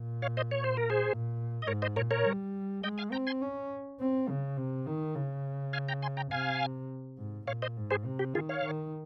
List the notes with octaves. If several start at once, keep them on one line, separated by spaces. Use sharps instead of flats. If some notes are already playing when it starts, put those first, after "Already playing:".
Already playing: A#2
C#5 F5
C5 D#5
C#5
C5
A#4
G#4 C5
A#2
D#5
G#2 A#4 C#5
C5 D#5
A#2 A#4 C#5
A#4 C#5
G3
G#3 D#5 G5
F5 G#5
C4 G5 A#5
G#5 C6
C#4
C4
C#3
C3
D#3
C#3
F5 G#5
G5 A#5
G#5 C6
G5 A#5
C3 F5 G#5
G#2
A#2 C#5 F5
C5 D#5
G#2
G#4 C5
C3
G4
D#3 F4 G#4
C#5 F5
D#3